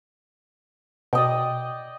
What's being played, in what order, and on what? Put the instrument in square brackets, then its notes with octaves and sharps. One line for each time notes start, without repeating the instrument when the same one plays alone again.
[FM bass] B2 [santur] D5 D#5 G5